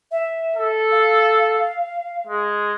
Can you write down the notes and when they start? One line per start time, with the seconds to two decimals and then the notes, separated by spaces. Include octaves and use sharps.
0.11 E5
0.56 A4
0.91 F5
2.27 G#3